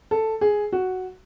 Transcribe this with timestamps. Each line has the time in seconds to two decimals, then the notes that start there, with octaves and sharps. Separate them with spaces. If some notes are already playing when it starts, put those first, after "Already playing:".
0.11 A4
0.41 G#4
0.73 F#4